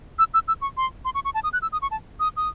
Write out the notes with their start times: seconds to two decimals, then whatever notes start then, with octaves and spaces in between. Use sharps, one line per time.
0.19 E6
0.34 E6
0.48 E6
0.62 C#6
0.77 C6
1.05 C6
1.15 C#6
1.25 C#6
1.34 A5
1.44 D#6
1.53 F#6
1.62 E6
1.72 D#6
1.82 C#6
1.91 A5
2.20 D#6
2.37 D#6